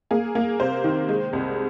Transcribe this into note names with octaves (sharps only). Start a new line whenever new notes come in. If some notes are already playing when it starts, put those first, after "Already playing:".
A#3 G#4
A#3
C3 C5
D#3
G#3
C2